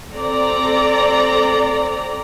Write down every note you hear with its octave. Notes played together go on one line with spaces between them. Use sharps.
C4 A4 D5 A#5